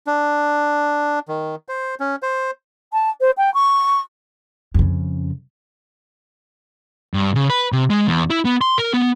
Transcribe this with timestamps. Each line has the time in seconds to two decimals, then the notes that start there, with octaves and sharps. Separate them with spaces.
0.07 D4
1.28 D#3
1.69 C5
2.00 C#4
2.23 C5
2.93 A5
3.21 C5
3.37 G5
3.54 C#6
4.74 F2 C#3
7.14 G2
7.35 C#3
7.50 B4
7.72 C3
7.90 G#3
8.07 E2
8.30 E4
8.45 B3
8.61 C6
8.78 A#4
8.93 B3